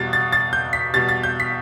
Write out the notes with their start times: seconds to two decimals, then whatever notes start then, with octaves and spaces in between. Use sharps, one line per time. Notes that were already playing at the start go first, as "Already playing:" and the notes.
Already playing: E2 B2 G3 A6
0.13 A6
0.32 A6
0.53 G6
0.73 B6
0.93 E2 B2 G3 A6
1.09 A6
1.24 G6
1.40 B6